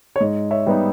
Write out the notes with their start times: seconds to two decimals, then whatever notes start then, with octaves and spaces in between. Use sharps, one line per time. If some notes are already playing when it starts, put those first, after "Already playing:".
0.16 C#5
0.21 G#2 D#5
0.51 C#5 E5
0.67 G3 B3 D#4